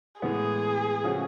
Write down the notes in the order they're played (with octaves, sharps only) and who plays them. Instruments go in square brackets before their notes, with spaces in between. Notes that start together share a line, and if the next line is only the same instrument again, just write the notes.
[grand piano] A2 E3 G#3 B3 [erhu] G#4
[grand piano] C#3 F3 A3 C#4 F#4